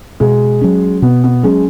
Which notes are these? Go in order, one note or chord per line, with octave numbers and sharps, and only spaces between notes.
B2 G#3
F#3 C#4
B2 B3
B3
F#3 G#3 C#4